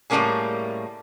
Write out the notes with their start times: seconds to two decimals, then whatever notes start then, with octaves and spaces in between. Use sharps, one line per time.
0.10 A2 G3 A3 A#3 C#4 G#4